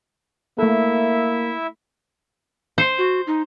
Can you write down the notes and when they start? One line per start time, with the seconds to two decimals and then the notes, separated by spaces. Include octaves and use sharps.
0.58 A3 A#3 E4 A4 E5
2.78 C5
2.98 F#4
3.27 D#4